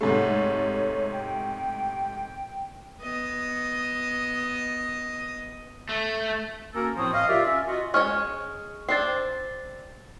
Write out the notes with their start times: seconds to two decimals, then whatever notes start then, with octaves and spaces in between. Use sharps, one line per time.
0.01 G#2 C3 A3 C#5
1.12 G5
3.02 B3 D#5
5.89 A3
6.74 A#3 C#4 F#4 A4 A#4
6.97 A2 F3 C4 C5 C#5 D#6
7.13 D#5 F5
7.28 F4 G4 A#4 D5 E5
7.44 C#4 E5
7.67 F4 F#4 D#5
7.94 G#3 C#4 C#5 C#6 F6
8.89 C4 D4 A6 C7